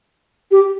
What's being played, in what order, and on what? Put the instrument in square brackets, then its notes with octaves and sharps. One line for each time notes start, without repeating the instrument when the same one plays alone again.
[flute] G4